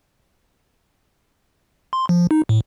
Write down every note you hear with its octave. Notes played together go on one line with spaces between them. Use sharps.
C6
F3
D#4
A2